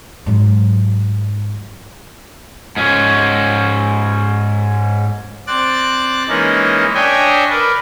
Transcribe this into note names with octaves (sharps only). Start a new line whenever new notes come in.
G#2 F#3
G#2 C#4
C4 D5 F#6 A6
E3 G#3 A#3 C#4 D#4
D4 C#5 D#5 E5 G5 G#5
A#4 B4 D5